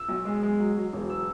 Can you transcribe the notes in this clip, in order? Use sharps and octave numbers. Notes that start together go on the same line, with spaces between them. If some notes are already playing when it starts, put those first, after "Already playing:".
Already playing: E6
B1
G#3
G#3
F#3
F#3
E1
E6